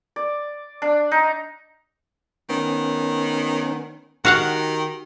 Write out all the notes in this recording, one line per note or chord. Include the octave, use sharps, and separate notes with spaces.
D5
D4
D#4
D#3 B3 C#4
D#3 F#4 G4 F5 F#5